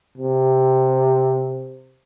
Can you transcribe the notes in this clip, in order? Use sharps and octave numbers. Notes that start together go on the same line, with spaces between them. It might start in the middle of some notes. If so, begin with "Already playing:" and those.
C3